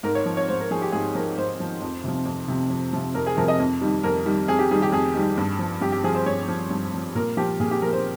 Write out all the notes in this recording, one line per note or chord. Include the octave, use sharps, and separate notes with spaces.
G#2 A#4
C#5
F3
C#5
G#2 C5
A#4
F3 G#4
G4
G#2 G#4
F3 A#4
G#2 C5
F3
F2
C3 F3
F2
C3 F3
F2
C3 F3
F2 A#4
G#4
C3 F3 A#4
D#5
F2
D#3 G3
F2 A#4
D#3 G3
F2 G#4
G4
D#3 G3 G#4
G4
F2 G#4
D#3 G3
G2
F3
G2 G4
G4
F3 G#4
C5
G2 C#5
F3
G2
F3
A#2 A#4
F3 G4
A#2 G#4
G4
F3 A#4
C5